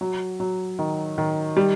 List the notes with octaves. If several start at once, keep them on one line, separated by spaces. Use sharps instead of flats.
F#3
F#3
D#3
D#3
G3